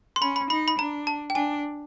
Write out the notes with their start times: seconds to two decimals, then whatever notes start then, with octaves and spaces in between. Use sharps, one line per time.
0.16 C6
0.21 C#4 B5
0.36 B5
0.50 D#4 B5
0.68 B5
0.78 D4 A#5
1.07 A5
1.30 G5
1.35 D4 G#5